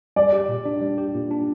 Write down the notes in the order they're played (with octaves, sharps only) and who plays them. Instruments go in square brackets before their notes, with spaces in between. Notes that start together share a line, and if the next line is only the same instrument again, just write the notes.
[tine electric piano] G3 [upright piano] D5
[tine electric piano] G4
A#2
D4
G3
G4
A#2
D4